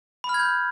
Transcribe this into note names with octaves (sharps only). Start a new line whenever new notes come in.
B5
F6
G#6
G6